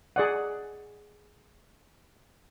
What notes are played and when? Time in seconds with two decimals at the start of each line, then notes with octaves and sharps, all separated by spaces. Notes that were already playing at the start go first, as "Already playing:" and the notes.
0.16 G#4 D5 F#5